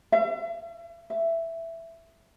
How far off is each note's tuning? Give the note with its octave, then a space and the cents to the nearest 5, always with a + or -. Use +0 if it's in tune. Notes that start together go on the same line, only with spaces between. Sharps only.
E5 +45
E5 +10